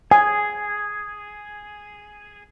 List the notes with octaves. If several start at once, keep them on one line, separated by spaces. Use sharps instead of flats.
G#4 G#5